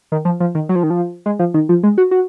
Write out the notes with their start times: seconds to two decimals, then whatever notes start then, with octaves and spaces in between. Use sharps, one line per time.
0.12 D#3
0.25 F3
0.40 F3
0.55 D#3
0.69 F#3
0.76 F3
0.83 D#3
0.90 F3
1.26 G#3
1.39 F3
1.54 D#3
1.69 F3
1.83 G#3
1.98 F#4
2.11 F#4